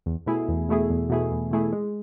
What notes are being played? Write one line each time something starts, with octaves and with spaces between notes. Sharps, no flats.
E2
B2 A3 E4 G#4
E2
B2 A3 E4 G#4
E2
B2 A3 E4 G#4
E2
B2 A3 E4 G#4
G#3